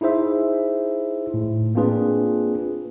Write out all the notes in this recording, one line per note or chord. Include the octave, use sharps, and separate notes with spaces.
D#4 E4 G#4 C5 E5
A2
A#3 C4 D4 F4 G#4 B4